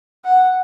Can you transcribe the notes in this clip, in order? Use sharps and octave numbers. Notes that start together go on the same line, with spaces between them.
F#5